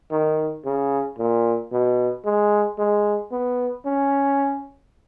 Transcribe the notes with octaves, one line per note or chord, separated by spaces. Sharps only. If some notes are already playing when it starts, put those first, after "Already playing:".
D#3
C#3
A#2
B2
G#3
G#3
B3
C#4